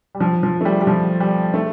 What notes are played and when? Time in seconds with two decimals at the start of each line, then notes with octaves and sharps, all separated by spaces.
0.15 G3
0.20 F3
0.43 F3
0.61 A3
0.65 G3
0.81 G3
0.87 F3
1.20 G3
1.54 A3